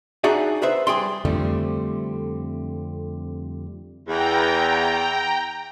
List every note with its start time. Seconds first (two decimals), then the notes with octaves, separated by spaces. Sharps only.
0.24 D4 D#4 F#4 G#4 D5 E5
0.62 G#4 B4 C5 E5
0.87 G3 G#4 G5 C6
1.25 F2 D3 G3 A3 C4
4.08 E2 G5 A#5